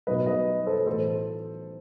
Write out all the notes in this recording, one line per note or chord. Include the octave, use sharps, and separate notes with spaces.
B1 B2 B4 D#5
B4 D#5
A4 C5
A1 A2 E3 A4 C5